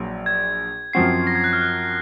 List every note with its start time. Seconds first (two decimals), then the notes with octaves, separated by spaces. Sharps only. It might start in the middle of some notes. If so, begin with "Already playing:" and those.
Already playing: A#1 A#2 F#3
0.26 G#6
0.93 F#2 F3 C4 F#4 C7
1.27 A#6
1.35 G#6
1.44 F#6
1.53 F6
1.61 F#6